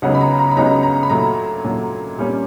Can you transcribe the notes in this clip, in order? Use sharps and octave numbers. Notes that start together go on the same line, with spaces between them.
C#2 C#3 F#3 B3 D#4 F#5
B5
A#5
A#5
B5
C#2 C#3 F#3 B3 D#4 A#5
A#5
B5
A#2 F#3 A3 A#5
A#2 F#3 A3
A#2 G3 A#3 C#4